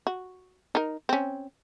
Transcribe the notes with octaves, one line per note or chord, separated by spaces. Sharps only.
F#4
D#4 A#4
C4 C#4